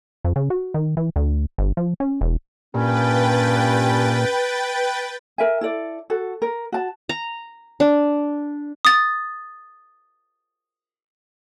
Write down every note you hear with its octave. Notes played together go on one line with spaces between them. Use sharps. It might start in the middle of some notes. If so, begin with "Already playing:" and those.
F2
C#3
F#4
D#3
E3
D2
G1
F3
C#4
E1
G2 A#2 C#4 B4 G5 A6
A#4 E5 G#5
E4 A4 D5
F#4 A4
A#4
F#4 A5
A#5
D4
D#6 A6